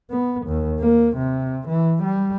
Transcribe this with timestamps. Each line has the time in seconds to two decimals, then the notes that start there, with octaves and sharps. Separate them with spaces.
0.10 B3
0.47 D#2
0.80 A#3
1.17 C3
1.68 E3
2.03 G3